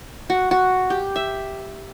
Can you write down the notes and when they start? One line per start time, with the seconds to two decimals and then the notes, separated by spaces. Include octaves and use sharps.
0.30 F#4
0.51 F#4
0.90 G4
1.16 E5